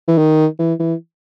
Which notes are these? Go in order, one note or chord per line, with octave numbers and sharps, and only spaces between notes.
E3
D#3
E3
E3